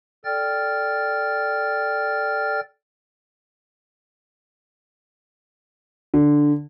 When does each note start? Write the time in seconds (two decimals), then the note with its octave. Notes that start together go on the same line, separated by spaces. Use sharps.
0.25 A4 D5 G5 F6 A6
6.14 D3